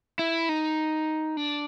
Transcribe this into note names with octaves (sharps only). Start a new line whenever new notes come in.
E4
D#4
D4